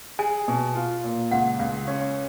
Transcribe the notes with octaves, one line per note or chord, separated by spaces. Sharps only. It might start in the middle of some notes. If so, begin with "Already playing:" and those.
G#4 G#5
B2
F4
A#2
C#2 F#5
C#2
C#4